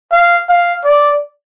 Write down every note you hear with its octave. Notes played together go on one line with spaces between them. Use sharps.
F5
F5
D5